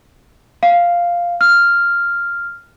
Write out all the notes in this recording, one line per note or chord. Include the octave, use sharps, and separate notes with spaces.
F5
F6